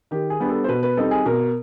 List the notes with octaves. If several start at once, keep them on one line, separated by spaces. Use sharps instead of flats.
D#3 G4
G#4
G3 B3 D4
A4
C5
B2 B4
B4
G3 C4 D#4 A4
G#4
B2 A#4